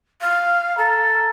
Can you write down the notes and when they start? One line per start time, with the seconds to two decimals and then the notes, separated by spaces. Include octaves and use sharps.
0.21 F5
0.78 A4 A#5